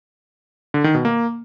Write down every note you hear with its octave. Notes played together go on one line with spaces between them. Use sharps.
D3
D#3
B2
A#3